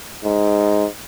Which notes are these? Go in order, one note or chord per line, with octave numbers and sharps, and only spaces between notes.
G#2